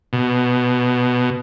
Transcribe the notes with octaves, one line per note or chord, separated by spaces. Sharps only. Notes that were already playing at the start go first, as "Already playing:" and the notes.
B2